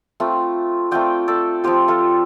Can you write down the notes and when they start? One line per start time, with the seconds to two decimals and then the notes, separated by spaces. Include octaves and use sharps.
0.20 A3 C4 F4
0.91 A3 C4 F4 D5 G5
1.28 A4 D5
1.64 F3 C4 F4 G4 C5
1.88 F4 A4